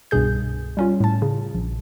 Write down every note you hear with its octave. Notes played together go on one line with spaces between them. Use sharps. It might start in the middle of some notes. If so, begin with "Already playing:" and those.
C2 G2 B2 G#4 G6
G3 C#4 F4
A2 A5
C#3
A#1